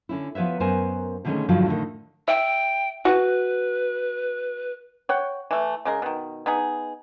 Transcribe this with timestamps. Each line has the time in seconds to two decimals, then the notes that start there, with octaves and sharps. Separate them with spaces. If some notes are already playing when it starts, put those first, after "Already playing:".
0.09 D3 C#4 E4
0.35 F3 B3 B4 C#5 E5
0.60 F#2 B3 A#4 C5 G#5
1.25 B2 D3 D#3 G#3 A3 C#4
1.48 G2 D3 D#3 F3 F#3
1.66 A2 D3 D#3
2.28 E5 G5
3.05 F#4 B4
5.09 C#5 F#5 G5
5.51 E3 A3
5.85 C#3 G#3 A#4
6.02 B2 D#3
6.46 B3 D#4 G#4